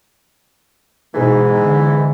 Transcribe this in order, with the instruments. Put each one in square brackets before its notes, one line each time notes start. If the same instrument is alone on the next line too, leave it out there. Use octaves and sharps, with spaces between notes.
[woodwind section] G#2 E3 [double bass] B2 D#4
[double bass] D3 B3